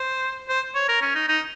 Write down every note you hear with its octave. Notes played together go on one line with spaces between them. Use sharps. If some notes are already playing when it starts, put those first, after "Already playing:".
Already playing: C5
C5
C#5
A#4
C#4
D#4
D#4